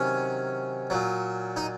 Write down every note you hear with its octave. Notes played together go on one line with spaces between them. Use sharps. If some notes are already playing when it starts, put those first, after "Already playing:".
Already playing: C3 D#3 F#3 C#4
A#2 F#3
D#4